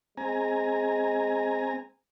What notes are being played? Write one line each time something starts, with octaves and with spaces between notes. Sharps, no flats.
G#3 C4 G#5 A#5